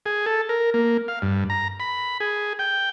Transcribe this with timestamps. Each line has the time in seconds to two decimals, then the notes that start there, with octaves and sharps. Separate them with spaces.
0.06 G#4
0.26 A4
0.49 A#4
0.74 A#3
1.08 F5
1.22 G2
1.50 A#5
1.80 B5
2.20 G#4
2.59 G5